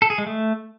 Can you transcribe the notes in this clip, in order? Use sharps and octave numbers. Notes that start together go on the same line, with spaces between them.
A4
G#4
G#3
A3